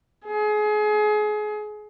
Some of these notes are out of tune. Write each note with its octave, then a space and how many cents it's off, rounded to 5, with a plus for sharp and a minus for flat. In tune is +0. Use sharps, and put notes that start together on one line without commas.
G#4 +30